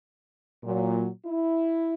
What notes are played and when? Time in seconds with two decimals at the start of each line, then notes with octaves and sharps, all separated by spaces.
0.63 A#2 F#3
1.25 E4